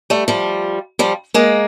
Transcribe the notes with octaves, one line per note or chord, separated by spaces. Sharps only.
G3 A3
F3 G3
F3 G3
G#3 A#3